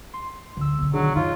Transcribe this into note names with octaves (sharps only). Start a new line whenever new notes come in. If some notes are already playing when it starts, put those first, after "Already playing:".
C6
D2 D3 E6
B1 D3
D#3 F#3 D4 G#4
F#2 D#4 F4 C#5